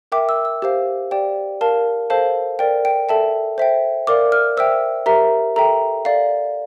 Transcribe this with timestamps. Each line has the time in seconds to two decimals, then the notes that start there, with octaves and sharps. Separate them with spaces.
0.12 A#4 E5 G5 D6
0.29 E6
0.45 E6
0.62 G4 C5 F5
1.11 G4 D5 G5
1.61 A#4 F5 A5
2.10 A4 C5 F5 A5
2.59 A#4 D5 G5
2.85 G5
3.09 A4 E5 G5 A5
3.58 C5 E5 G5
4.07 A#4 D5 F5 D6
4.32 F6
4.57 C5 E5 G5 E6
5.06 G4 A#4 E5 A#5
5.56 A4 E5 G5 A#5
6.05 A4 D5 F5